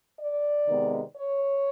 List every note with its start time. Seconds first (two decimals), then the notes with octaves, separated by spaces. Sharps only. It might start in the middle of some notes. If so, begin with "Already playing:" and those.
0.19 D5
0.66 C3 D#3 G#3 B3
1.15 C#5